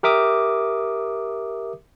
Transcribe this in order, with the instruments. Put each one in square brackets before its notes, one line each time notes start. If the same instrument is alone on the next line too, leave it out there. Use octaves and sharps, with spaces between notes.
[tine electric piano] G4 A#4 E5 D6 D#6